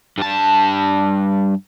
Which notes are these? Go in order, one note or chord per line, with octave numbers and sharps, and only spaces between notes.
G2 A5